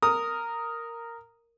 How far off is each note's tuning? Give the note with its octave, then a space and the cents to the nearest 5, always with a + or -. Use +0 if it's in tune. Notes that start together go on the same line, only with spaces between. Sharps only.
A#4 -5 D#6 +0